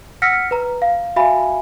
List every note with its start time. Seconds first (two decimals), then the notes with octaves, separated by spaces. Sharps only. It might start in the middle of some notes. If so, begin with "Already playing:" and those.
0.22 F#5 E6 F6 A#6 B6 C#7
0.51 B4 A#5
0.82 F5
1.16 F#4 E5 F5 G#5 B5